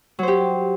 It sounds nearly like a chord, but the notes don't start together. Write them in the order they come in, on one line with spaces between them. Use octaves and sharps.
F#3 C5 G4